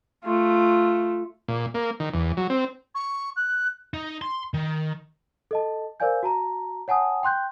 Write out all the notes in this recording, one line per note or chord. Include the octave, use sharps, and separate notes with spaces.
A3 F4
A#2
A#3
D#3
E2
F#3
C4
C#6
F#6
D#4
C6
D#3
A4 D#5 A5
A#4 C5 D5 F5 G#5 G6
F#4 A5 A#5
C#5 F#5 G#5 A5 D#6
G5 C6 F#6 G6